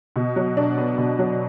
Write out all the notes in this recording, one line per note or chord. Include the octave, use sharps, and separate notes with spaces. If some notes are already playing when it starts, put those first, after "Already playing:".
B2
F#3
D4
B3
B2
F#3